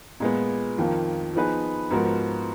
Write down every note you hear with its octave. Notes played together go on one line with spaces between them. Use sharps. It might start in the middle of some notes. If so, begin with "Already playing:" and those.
A#2 G#3 B3
F2 D#3 A#3 F4
F3 B3 D#4 G#4 B4
G#2 F3 B3 F#4 A#4